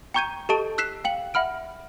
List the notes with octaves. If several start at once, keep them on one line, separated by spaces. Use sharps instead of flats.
G5 A#5 C#6 G6 G#6 D#7
G4 A4 D#5 A5 C#6 D7
E6 F#6 B6 C7 E7
F5 G5 F#7
E5 F#5 B5 F6 D7